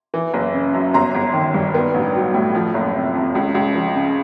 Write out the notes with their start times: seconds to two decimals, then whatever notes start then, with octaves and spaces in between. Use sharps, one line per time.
0.14 E3
0.34 F#1
0.54 C#3
0.74 F#2
0.94 G1 A#5 C6
1.15 G1
1.34 D#3
1.54 G2
1.74 B3
1.94 A1
2.15 F#3
2.34 A2
2.55 F3
2.74 F#1
2.94 C3
3.15 F2
3.35 C#2
3.55 C#2
3.75 F3
3.95 C#3